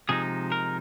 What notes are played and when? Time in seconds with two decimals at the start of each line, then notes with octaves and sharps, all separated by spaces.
0.09 C3 F3 G#3 D#4 G#4
0.52 A#4